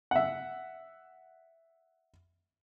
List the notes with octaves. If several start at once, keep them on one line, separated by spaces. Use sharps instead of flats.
E5 F#5